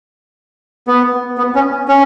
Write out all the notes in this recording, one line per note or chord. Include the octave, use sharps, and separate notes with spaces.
B3
B3
C#4
C#4